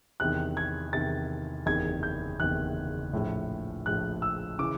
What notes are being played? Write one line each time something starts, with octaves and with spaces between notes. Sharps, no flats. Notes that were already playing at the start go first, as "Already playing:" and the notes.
E2 C3 D#3 F#6
G#6
E2 C3 D#3 A6
F#1 E2 C3 D#3 G#6
G6
F#1 E2 C3 D#3 F#6
A#1 A2 F3
A#1 A2 F3 F#6
E6
C#3 E3 D6